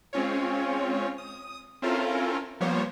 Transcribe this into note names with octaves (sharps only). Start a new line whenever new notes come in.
G#3 C4 C#4 F4 C#5
D#6
C4 C#4 E4 F4 A4 A#4
F3 G3 A#3 B3 C5 C#5